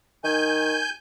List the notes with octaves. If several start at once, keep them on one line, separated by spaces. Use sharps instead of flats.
D#3 G#5 G6